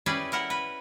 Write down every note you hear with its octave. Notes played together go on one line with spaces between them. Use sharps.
C#4 E4 G4 G#4 B4 D5
E4 A#4 F#5
B4